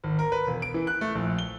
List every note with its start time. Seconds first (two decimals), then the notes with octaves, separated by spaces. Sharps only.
0.04 G#1
0.19 A#4
0.32 B4
0.47 E1
0.62 D7
0.74 E3
0.87 F#6
1.01 A3
1.15 A#1
1.39 G7